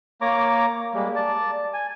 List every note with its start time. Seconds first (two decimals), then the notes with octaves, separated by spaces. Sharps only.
0.21 A#3 C#5 A#5 D6
0.94 G3 G#3 A#3
1.16 D5 A5
1.73 G#5